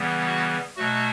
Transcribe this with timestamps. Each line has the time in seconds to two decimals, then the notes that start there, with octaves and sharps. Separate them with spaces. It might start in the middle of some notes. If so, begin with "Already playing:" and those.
Already playing: C#3 E3 G3 B3
0.26 F#4
0.76 B2 F#3 A3 F#4